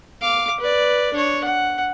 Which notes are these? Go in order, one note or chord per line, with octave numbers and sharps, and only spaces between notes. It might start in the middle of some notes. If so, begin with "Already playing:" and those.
F5 D6
B4 D5
D4 C#5
F#5